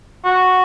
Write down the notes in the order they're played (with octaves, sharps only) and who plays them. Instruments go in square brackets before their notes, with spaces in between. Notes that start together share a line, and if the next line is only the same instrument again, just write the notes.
[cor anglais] F#4